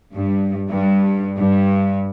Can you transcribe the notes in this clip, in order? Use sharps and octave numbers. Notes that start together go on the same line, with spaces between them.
G2
G2
G2